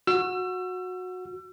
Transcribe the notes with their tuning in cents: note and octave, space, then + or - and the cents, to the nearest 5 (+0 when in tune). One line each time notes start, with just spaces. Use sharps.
F#4 -15 E6 +30